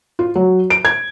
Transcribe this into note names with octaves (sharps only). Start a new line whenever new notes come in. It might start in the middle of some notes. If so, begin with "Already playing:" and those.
F4
F#3
D7
G#6